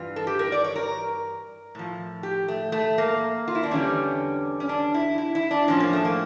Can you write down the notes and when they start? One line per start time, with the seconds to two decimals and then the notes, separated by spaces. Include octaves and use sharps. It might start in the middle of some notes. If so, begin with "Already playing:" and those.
Already playing: G2 E3 F4
0.16 A4
0.27 G4
0.39 A#4
0.52 D5
0.64 C#5
0.76 A#4
1.75 A2 F3
2.23 G4
2.48 A3
2.72 A3
2.98 A#3
3.48 F4
3.55 E4
3.63 D4
3.71 E2 D3 G3 C#4
4.60 C#4
4.69 D4
4.94 E4
5.18 E4
5.35 E4
5.51 D4
5.67 A2 F3 C#4
5.80 A#3
5.93 A3
6.05 A#3